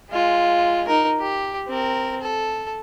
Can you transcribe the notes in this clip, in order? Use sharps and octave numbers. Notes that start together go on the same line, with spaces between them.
G#3 F4
D#4 A#4
G4
C4 A#4
A4